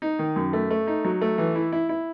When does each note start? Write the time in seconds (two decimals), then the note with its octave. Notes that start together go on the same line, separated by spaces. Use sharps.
0.02 D#4
0.19 D#3
0.36 F#2
0.53 A3
0.70 A3
0.87 D#4
1.05 F#3
1.21 A3
1.38 E3
1.56 E4
1.72 E4
1.89 E4